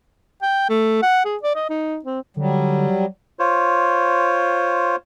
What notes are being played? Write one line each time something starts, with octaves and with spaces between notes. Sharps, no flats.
G5
A3
F#5
G#4
D5
D#5
D#4
C4
D3 F#3 G3
F4 C5 C#5